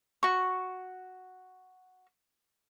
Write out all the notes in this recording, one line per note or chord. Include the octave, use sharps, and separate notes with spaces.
F#4 C#6